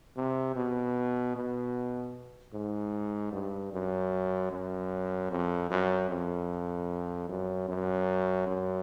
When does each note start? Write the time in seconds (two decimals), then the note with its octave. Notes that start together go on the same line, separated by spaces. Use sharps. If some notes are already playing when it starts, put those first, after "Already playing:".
0.17 C3
0.56 B2
1.36 B2
2.54 G#2
3.33 G2
3.73 F#2
4.52 F#2
5.31 F2
5.71 F#2
6.10 F2
7.29 F#2
7.69 F#2
8.47 F#2